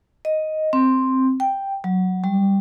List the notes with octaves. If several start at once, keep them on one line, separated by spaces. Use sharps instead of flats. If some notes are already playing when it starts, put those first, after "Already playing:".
D#5
C4
G5
F#3
G3